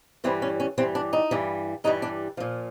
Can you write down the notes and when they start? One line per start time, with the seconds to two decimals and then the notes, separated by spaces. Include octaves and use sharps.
0.24 G2 E3 G3 C4
0.42 C#4
0.60 C#4
0.78 G2 E3 G3 C4
0.95 D4
1.13 D#4
1.31 G2 E3 G3
1.84 G2 E3 G3 D#4
2.02 D4
2.37 A#2 F3